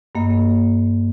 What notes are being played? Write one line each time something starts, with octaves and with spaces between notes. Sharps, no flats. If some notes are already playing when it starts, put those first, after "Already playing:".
G2 A#3 D#5